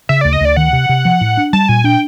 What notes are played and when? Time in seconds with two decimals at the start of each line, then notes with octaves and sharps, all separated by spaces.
0.09 C#3 E5
0.21 D2 D5
0.33 D#5
0.41 D2 D5
0.56 D#3 F#5
0.73 C3
0.89 C3
1.05 F3
1.21 A2
1.37 D4
1.53 G3 A5
1.69 A#2 G#5
1.84 D4 G5